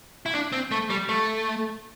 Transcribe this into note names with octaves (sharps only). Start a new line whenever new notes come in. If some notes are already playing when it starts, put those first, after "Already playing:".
E4
D4
C4
A3
G3
A3